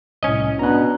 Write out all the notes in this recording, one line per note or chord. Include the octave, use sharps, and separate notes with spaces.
C2 A2 C#4 D#5
B2 D4 A#5 F#6